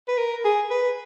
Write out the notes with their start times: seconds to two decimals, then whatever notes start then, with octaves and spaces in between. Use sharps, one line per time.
0.08 B4
0.18 A#4
0.45 G#4
0.71 B4